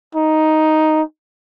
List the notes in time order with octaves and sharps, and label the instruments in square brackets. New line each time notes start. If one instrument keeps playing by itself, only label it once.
[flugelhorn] D#4